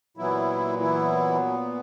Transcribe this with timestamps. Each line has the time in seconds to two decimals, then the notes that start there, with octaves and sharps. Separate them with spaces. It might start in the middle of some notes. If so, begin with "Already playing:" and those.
0.17 A#2 E3 F#3 B3 E4
0.80 E3 E4